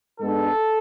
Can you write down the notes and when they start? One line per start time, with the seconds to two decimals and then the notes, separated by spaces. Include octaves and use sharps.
0.19 G#2 G#3 B3 D4 A4